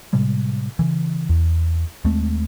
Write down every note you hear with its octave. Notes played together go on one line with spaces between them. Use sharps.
A2 C3 G3 G#3
C#3 E3
E2
D#2 G#3 A3 C4